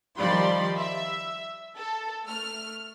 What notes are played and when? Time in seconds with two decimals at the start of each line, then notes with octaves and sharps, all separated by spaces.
0.18 D#3 F3 G3 D5 B5 C6
0.78 E5
1.77 A4
2.27 A3 F6